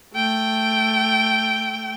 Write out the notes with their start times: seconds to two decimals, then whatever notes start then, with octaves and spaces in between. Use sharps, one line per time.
0.14 A3 G5